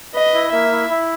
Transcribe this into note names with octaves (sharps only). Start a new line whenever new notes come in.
B4 D#5
E4
A#3 E5
E4
E4